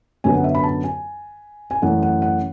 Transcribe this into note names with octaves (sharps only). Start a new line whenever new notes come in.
F#2 D3 F#3 B3 G#5
F#5
E5
B5
A5
G#5
G#5
F#2 E3 A3 F#5
F#5
F#5